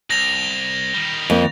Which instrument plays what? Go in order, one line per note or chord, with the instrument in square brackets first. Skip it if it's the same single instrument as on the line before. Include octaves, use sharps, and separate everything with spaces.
[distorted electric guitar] C2 [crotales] A#6 F7
[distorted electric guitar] D#3 G3
[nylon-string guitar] F2 A#3